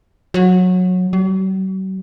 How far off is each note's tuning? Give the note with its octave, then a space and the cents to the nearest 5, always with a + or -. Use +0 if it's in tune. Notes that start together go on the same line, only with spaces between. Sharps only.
F#3 -20
F#3 +45